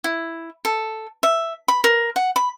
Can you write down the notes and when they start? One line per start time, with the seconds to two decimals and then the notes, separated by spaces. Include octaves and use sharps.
0.04 E4
0.65 A4
1.23 E5
1.68 B5
1.84 A#4
2.16 F#5
2.36 B5